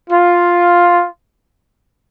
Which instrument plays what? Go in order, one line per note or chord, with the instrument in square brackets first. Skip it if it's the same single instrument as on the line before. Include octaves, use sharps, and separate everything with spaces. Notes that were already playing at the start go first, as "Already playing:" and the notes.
[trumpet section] F4